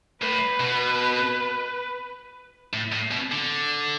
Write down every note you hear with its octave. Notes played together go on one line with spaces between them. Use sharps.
A2 B4
B2
A2
A2
B2
D3